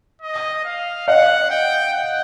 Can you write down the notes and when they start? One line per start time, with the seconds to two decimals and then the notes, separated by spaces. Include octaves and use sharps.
0.22 D#5
0.65 F5
1.08 D#5 F5 F#5
1.50 G5
1.93 F#5